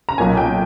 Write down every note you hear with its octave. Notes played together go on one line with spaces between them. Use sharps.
A#5
B1 A#2 A#3 G#5
G5